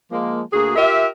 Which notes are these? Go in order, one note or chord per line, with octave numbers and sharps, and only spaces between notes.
F3 G#3 A#3
D2 A#3 F#4 G#4
F4 G4 A#4 E5